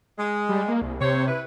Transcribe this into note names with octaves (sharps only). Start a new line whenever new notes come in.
G#3
G3
A#3
C2
C3 C4 C5 C#5
E4 B4